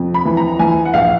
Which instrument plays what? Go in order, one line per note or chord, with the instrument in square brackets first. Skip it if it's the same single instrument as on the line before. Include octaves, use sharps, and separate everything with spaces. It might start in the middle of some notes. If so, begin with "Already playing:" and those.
Already playing: [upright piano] F2 C3
B5
E3
A#5
E3 G#5
F#5
A#1 F5